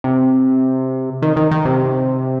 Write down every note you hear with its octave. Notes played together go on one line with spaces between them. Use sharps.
C3
D#3
D#3
D#3
C3